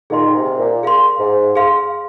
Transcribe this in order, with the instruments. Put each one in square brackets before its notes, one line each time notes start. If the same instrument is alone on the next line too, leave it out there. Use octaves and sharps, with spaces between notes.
[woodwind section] A#2 D#3 [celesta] G#4 F5 C6
[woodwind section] D#3
G#2 C3
A#2
[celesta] G#4 F5 C6
[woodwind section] G#2
[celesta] G#4 F5 C6